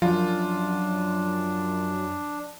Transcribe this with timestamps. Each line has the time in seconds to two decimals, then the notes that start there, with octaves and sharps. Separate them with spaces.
0.02 F#2 F3 D4 F4